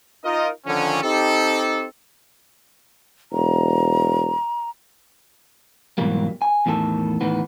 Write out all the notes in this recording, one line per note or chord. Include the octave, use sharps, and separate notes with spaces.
D#4 F4 A#4 D#5
D3 D#3 F3 C#4
C4 D#4 G4 A4
E1 A#5
G#2 B2 E3 F#3 G3 A#3
G#5
E2 A2 D#3 G4 A4
D#2 A2 D#3 E3 B3